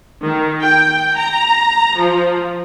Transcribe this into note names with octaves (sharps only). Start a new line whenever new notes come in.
D#3
G5
A#5
F3